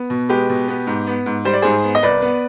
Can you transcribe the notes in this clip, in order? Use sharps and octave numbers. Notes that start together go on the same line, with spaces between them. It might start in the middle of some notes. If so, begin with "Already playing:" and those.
Already playing: B3
B2
G#3 G4 B4
B2
B3
G#2
B3
G#2
G3 C5
D5
G#2 G#4 C5
B3
D#5
C2 B4 D5
B3